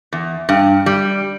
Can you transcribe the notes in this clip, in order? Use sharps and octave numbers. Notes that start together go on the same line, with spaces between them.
E2
G2
G3